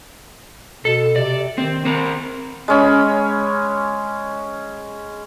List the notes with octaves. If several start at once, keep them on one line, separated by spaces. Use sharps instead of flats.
B2 A4
C3 D5
D#3 C4
C4 A#4
G#3 C#4 B5